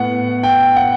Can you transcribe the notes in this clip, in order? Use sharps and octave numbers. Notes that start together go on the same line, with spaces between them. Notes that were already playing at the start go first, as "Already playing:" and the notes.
Already playing: A2 B3 F#5
G5
F#5